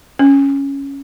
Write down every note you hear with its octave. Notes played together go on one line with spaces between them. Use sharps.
C#4